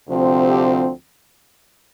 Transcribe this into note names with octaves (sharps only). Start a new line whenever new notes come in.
D2 C3 F3 C4
G4